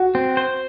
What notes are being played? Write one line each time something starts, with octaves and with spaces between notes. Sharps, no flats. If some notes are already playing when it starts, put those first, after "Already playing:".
Already playing: F#4
C4
C5